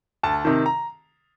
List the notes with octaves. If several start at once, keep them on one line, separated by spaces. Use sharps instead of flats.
D2 A5
C3 D#3
A#5